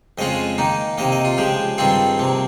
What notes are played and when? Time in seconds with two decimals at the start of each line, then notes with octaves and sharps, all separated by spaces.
0.18 F2 C#3 G#3 C#4 F4 D#5
0.58 D#3 A#3 D#4
0.98 C3 D#3 A#3 D#5
1.12 D#5
1.25 F4
1.38 C#3 F3 G#3 G4
1.78 G2 D#3 G3 C4 F4 G#4
2.19 C3 F3 A#3